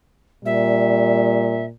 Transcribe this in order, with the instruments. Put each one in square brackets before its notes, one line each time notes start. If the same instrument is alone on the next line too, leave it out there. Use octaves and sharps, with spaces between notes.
[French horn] A#2 [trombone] G3 [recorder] E5